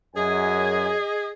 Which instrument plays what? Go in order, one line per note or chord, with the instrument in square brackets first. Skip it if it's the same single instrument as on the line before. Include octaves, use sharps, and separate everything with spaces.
[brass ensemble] F#2 G#5 [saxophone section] G#4 D#5